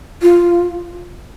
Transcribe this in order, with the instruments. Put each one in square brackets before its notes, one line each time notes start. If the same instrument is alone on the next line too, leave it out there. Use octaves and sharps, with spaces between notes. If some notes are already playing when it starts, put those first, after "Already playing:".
[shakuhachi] F4